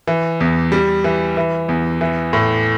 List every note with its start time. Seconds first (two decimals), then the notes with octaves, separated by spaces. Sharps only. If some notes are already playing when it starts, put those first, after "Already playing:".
0.07 E3
0.41 E2
0.72 G3
1.04 E3
1.37 E3
1.69 E2
2.01 E3
2.33 A2